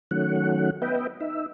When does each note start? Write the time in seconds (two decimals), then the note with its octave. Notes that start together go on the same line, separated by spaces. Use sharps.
0.11 D#3 F#3 A3 C#4 F#5
0.82 B3 B4 D#5 E5 G5
1.20 D#4 E5